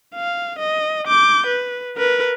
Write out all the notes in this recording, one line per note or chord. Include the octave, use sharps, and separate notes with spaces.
F5
D#5
D6 G6
B4
A#4 B4